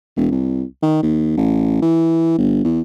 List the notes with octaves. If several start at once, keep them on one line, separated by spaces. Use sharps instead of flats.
E1
C2
D#3
D#2
A1
E3
G1
E2